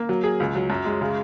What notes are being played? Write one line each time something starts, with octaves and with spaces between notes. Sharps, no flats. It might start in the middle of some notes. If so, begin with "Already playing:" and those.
Already playing: A#3
F#3
G#4
C#2
F#3
F#2
G#3
C#3